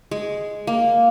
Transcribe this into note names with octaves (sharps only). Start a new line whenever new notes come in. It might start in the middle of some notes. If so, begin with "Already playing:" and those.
G#3
A#3